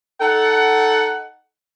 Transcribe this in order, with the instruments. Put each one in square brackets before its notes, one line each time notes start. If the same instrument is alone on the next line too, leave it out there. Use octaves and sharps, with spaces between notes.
[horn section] D#4 A4 F#5